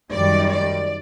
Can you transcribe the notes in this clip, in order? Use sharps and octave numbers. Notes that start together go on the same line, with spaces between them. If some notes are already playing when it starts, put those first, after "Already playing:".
F#2 D#3 G3 D5
D5